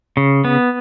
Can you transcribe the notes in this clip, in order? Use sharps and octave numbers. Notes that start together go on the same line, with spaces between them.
C#3
B3